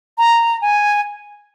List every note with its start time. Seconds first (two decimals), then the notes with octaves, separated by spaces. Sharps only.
0.18 A#5
0.62 G#5